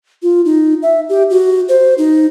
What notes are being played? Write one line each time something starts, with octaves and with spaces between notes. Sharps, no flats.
F4
D#4
E5
G4
F#4
C5
D#4